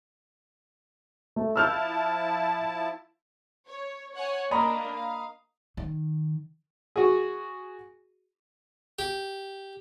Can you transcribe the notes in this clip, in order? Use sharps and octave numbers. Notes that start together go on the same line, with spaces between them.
A3
F3 E4 A5 E6 F6 G6
C#5
C#5 F#5 G#5
A#3 D4 D#5 A#5 B5
F5
D#3
F#4 G#4
G4